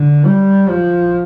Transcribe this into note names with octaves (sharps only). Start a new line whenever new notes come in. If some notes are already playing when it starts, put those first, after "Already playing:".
Already playing: D3
G3
F3